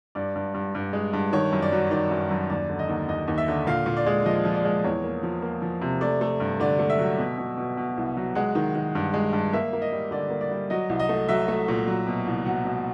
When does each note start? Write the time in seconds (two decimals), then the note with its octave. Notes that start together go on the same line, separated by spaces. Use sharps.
0.15 G2 D5
0.35 G2
0.54 G2
0.75 G2
0.93 G#3
1.13 G2
1.33 D#3 C#5
1.52 F#2
1.62 D5
1.72 F#3
1.91 D#3 D5
2.11 F#2
2.31 F#2
2.50 D#2 D5
2.70 D3
2.79 D#5
2.89 D#2
3.08 D#2 D#5
3.28 D#2
3.38 E5
3.48 D3
3.67 A#2 F5
3.86 A#2
3.97 D5
4.06 G#3
4.25 F3 D#5
4.45 F3
4.55 D5
4.65 G#3
4.84 E2 C#5
5.04 A#3
5.23 F3
5.42 A#3
5.62 F3
5.81 C3
6.01 A3 D5
6.21 A3
6.40 G2
6.60 D3 D5
6.79 A3
6.90 E5
6.99 F#3
7.18 B2
7.38 B2
7.58 B2
7.77 B2
7.97 C2
8.17 F#3
8.35 G#3 F#5
8.55 D#3
8.75 D#3
8.95 G2
9.14 G#3
9.33 G2
9.53 A#3 E5
9.73 A#3
9.82 D#5
9.92 G3
10.11 D3 D5
10.30 A#3
10.41 D5
10.51 G3
10.70 F#3 D#5
10.89 C2
10.99 D#5
11.09 A3
11.29 F#3 E5
11.48 A3
11.68 A#2
11.87 F#3
12.07 B2
12.27 C2
12.46 F#3 F#5
12.65 B2